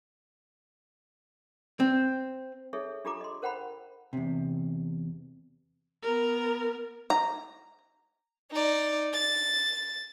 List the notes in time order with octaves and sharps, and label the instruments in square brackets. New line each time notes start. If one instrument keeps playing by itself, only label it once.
[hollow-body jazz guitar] C4
[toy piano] D#4 G#4 A4 C#5 E5
D4 F4 G4 A4 A#5 D6
D#5 C6
A#4 C5 F#5 G5 A#5 B5
[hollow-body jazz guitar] E2 C3
[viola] B3 A#4
[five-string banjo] A#5
[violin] D#4 D5
A6